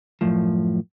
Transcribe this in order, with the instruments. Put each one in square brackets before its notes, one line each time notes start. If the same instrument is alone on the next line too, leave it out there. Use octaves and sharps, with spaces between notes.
[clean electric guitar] F#2 A2 F3